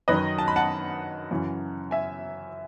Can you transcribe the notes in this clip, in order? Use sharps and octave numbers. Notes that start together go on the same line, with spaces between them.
F#2 D#3 F#3 B4 D#5
A5
B5
F#5 A5
F#2 C#3 E3
E5 G#5